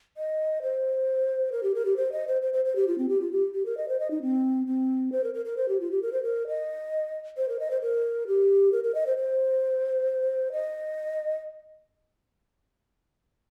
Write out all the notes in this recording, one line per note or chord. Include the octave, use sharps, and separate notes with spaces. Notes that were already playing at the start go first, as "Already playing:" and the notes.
D#5
C5
A#4
G4
A#4
G4
C5
D#5
C5
C5
C5
C5
G4
F4
C4
G4
F4
G4
G4
A#4
D#5
C5
D#5
D#4
C4
C4
C5
A#4
A#4
A#4
C5
G4
F4
G4
A#4
C5
A#4
D#5
C5
A#4
D#5
C5
A#4
G4
A#4
A#4
D#5
C5
C5
D#5